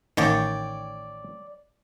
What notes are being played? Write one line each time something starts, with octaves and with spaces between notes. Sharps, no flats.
A1 D#3 C#5 D5 G5